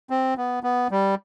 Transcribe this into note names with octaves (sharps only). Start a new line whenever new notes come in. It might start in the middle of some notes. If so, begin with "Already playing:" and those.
C4
B3
B3
G3